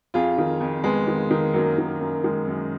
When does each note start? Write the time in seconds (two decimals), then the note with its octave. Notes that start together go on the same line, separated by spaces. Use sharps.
0.14 F2 F4 G#4
0.38 D#3
0.60 F2
0.84 F2 G#3 B3
1.07 D#3
1.31 D#3
1.54 F#2 F#3 A#3
1.78 D#3
2.00 F#2
2.24 D#3 G#3
2.47 F#2